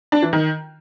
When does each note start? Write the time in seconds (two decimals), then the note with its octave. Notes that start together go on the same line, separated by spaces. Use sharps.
0.12 D4
0.22 E3
0.33 D#3